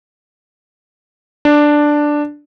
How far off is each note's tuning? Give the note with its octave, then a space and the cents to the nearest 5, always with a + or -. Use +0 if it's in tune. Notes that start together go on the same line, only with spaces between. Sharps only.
D4 +5